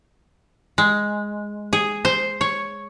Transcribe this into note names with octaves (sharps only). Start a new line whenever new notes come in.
G#3
G#4
C5
C#5